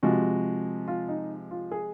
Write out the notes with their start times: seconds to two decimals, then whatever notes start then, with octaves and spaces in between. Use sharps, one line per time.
0.03 C3 F3 G#3 F#4
0.88 F4
1.08 D#4
1.51 F4
1.71 G#4